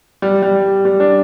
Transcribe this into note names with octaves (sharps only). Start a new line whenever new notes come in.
G3
G3
G3
D4